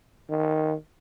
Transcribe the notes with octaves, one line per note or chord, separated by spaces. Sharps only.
D#3